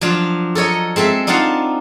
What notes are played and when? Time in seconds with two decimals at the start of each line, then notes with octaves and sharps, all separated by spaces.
0.01 F3 F#3 D4 F4
0.55 A4 A#4 C#5 D#5
0.96 G#3 C4 A4 E5
1.27 D4 D#4 F4 F5 F#5 A5